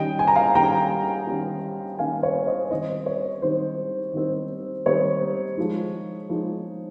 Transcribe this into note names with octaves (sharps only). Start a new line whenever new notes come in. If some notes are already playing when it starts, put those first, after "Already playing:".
Already playing: D#3 G3 C#4 D#5 G5
G#5
A#5
F5 G#5
D#3 G3 C#4 G5 A#5
D#3 G3 C#4
D#3 G3 C#4 F5 G#5
C#5 F5
C5 D#5
D#3 G3 C4 D#4 C5 D#5
C#5
D#3 G3 C4 D#4 C5
D#3 G3 C4 D#4
D#3 G3 C4 D#4 C#5
F3 G#3 D#4
F3 G#3 D#4